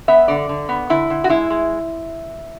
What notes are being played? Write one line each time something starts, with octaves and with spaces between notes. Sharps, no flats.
B3 E5
D3 D5
D3
B3
D3 E4
D3
F#4
G#3 E4
G#3